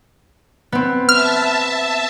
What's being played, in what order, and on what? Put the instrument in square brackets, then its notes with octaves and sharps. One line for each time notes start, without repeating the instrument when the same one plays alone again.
[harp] B3 C4
[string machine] E5 A5 [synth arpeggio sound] F6